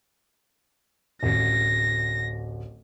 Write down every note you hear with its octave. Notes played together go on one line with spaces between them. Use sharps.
D1 A1 A#6